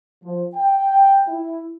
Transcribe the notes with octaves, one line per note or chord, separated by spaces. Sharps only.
F3
G5
E4